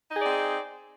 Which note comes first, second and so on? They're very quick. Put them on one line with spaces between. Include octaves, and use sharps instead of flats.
D#4 G#4 D5 C4